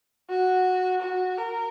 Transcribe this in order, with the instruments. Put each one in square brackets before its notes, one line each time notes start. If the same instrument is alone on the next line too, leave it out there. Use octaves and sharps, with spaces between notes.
[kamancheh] F#4
F#4
A#4